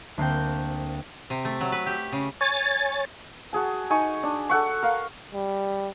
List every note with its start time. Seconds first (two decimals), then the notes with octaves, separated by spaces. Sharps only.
0.17 D2 A#3 C4 G5
1.30 C3
1.45 A3
1.61 F#3
1.72 B4
1.86 G4
2.12 C#3
2.41 C#5 G#5 A6
3.53 F#4 G#4 A5
3.90 D#4 G#5 C#6
4.23 D4
4.50 A4 F#5 C#6
4.83 A#4 F5
5.34 G3